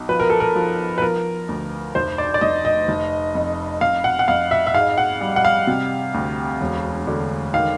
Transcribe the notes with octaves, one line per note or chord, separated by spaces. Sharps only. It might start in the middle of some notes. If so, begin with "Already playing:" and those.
Already playing: B1
F3 B4
A#4
A4
A#4
F3
B4
F3 A#4
D2
F1 C5
D5
D5
F1 D#5
D#5
F1
F2
F2 F5
F#5
F#5
F2 F5
E5
E5
G#2 F5
F#5
G3
F#5
F5
C3
D2
E1
D3
D#3 F5